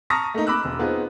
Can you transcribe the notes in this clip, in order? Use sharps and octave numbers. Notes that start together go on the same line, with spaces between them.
A5 A#5 C#6 D#6 F6 A#6
A3 A#3 D#4
B5 D6 E6 F#6
E1 E6
B3 C4 D#4 F4 G#4